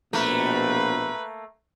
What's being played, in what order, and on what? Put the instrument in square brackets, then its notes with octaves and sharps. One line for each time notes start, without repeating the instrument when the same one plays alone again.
[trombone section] A#1 B2 [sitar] A3 A#3 [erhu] B4